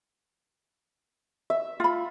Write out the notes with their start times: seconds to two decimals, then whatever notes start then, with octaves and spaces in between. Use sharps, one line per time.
1.50 E5
1.80 F4 B5